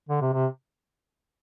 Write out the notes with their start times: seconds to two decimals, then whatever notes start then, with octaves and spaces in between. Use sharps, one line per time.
0.09 D3
0.22 C3
0.33 C3